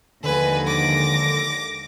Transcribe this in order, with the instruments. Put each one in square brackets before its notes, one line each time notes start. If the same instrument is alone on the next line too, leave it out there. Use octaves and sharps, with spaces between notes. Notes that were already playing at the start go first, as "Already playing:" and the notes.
[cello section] D#2 F3 G#3 [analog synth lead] D3 [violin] B4 G#5
[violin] D6 A#6